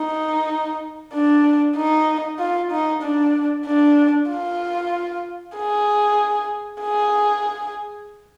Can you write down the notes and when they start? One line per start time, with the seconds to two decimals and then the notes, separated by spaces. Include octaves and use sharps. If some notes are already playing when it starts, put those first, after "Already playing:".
Already playing: D#4
1.13 D4
1.76 D#4
2.39 F4
2.71 D#4
3.02 D4
3.65 D4
4.30 F4
5.56 G#4
6.82 G#4